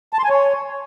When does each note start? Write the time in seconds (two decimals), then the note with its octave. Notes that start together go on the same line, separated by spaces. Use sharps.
0.13 A5
0.19 C6
0.24 G#5
0.30 C#5